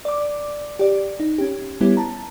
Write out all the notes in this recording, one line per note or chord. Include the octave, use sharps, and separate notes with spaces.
D5 D6
G4 D5
D#4
C#4 G4
G3 B3 C#4 E4 G4
A5 A#5